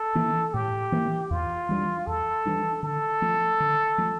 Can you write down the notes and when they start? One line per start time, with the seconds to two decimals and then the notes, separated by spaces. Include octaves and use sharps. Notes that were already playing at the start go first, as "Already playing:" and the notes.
Already playing: A4
0.15 E3 A#3
0.54 A2 G4
0.92 E3 A#3
1.30 E2 F4
1.69 E3 G3 D4
2.07 E2 A4
2.45 E3 G3 D4
2.83 D3 A4
3.21 F3 A3
3.60 D3
3.98 F3 A3